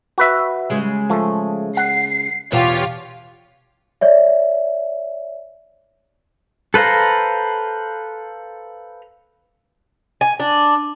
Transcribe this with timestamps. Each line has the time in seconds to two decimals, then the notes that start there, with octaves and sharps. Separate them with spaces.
0.18 F#4 B4 E5
0.70 C#3 G#3
1.10 F3 A3
1.77 F#5 C7
2.52 E2 B2 F4 G4 C#5
4.01 C#5 D5 E5
6.74 A4 B4 C5 F5 A#5
10.21 G#5
10.40 D4